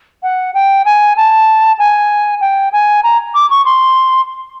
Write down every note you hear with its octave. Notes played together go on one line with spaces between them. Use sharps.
F#5
G5
G#5
A5
G#5
G5
G#5
A#5
D6
C#6
C6